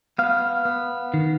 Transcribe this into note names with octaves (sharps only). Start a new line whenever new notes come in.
B3 F5
B3
D#3